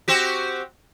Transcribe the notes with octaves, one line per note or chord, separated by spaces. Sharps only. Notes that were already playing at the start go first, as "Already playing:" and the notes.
C4 F#4 G4